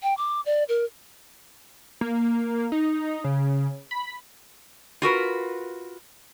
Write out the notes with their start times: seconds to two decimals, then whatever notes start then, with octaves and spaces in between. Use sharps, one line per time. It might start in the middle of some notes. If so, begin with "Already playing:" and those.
0.03 G5
0.18 D6
0.46 D5
0.69 A#4
2.01 A#3
2.72 D#4
3.24 C#3
3.91 B5
5.02 F4 F#4 A#4 B4